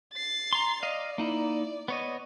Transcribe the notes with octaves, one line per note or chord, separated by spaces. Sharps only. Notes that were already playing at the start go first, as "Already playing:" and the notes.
A6 C7
A#5 C6
D5 D#5 F5
A#3 D#4 E4
B3 C#5 D#5